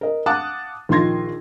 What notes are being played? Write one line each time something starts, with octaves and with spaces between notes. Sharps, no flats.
A#4 D#5
F5 F#5 A5 D6 D#6 F#6
A#1 D#3 F4 C6 G#6 A#6